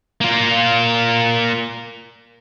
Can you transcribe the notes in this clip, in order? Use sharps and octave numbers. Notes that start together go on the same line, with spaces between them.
A#3 F4